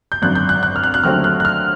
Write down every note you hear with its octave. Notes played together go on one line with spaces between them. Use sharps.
G6
G#1 F#2 D3 F#6
G6
F#6
F#6
F6
F#6
F#6
D#2 D3 F#3 A3 C4 F6
F#6
F#6
F6